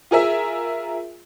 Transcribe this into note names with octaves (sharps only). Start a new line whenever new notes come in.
F4 G#4 A#4 E5